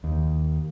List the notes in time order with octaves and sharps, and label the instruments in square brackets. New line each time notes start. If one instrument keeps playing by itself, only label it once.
[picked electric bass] D#2